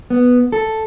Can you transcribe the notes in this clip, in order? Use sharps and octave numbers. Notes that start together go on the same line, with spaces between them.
B3
A4